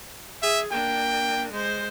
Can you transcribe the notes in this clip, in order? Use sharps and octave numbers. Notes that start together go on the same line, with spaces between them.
G#4 E5
A#3 D4 G5
G#3 C5